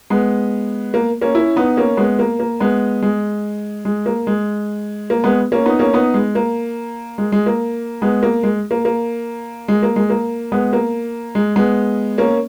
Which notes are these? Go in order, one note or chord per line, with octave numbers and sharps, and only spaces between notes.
G#3 B3
A#3
A#3 C#4
C#4 E4
B3 D#4
A#3 C#4
G#3 B3
A#3
A#3
G#3 B3
G#3
G#3
A#3
G#3
A#3
G#3 B3
A#3 C#4
B3 D#4
A#3 C#4
B3 D#4
G#3
A#3
G#3
G#3
A#3
G#3 B3
A#3
G#3
A#3
A#3
G#3
A#3
G#3
A#3
G#3 B3
A#3
G#3
G#3 B3
A#3 C#4